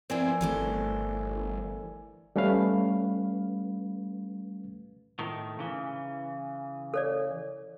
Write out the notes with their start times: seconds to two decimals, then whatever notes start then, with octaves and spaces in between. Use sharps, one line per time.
0.10 F3 B3 C4 E4 A#4 D5 G#5
0.41 G1 E3 A3 C5
2.36 G3 A3 C#4 B4 F5
5.19 A2 D#3
5.59 C#3 E3
6.94 A4 C#5 D5